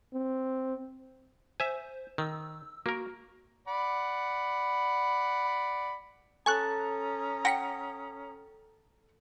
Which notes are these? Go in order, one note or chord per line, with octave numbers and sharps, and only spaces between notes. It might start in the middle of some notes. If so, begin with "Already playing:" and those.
C4
C5 E5 G#5
D#3 E6
A#3 F#4 A#4
D5 F#5 B5
C#4 A4 G#5 A#5 C#6 D#6 F#6
F#5 G5 A#6 B6 C#7